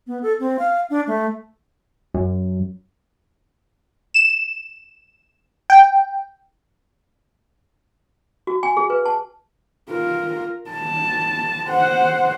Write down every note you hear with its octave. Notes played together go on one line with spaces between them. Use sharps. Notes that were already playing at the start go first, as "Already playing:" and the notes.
B3
A4
C4
F5
D4
A3
F#2
E7
G5
F#4
G#5
G#4
B4
A5
F4 A#4
A5
C5 F#5